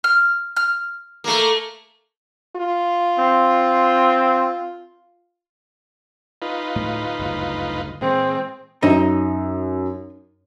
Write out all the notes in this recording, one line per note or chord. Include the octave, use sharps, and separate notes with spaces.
F6
F6
A3 A#3
F4
C4
D#4 F4 B4
D1 A2 A3
F#1 D2 G2
A#2 E3 G#3 C4
F#2 D#4 D#5 E5